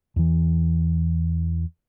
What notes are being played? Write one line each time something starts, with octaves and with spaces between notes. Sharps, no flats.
E2 E3